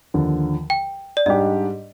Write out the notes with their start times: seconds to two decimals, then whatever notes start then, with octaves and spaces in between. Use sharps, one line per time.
0.14 D#2 D3 F3
0.70 G5
1.17 D5
1.26 G#2 G3 D4 G4 D#5